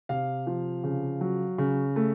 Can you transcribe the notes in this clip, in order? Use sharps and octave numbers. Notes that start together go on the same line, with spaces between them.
C3 F5
F3
C#3
F#3
C#3
A3